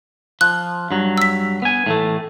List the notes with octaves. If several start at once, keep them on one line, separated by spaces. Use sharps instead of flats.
F3 F#6
G2 F#3
E6 B6
B3 G#5
A2 E3 A3